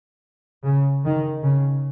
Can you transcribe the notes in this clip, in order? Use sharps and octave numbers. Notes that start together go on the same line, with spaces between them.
C#3
D#3
C#3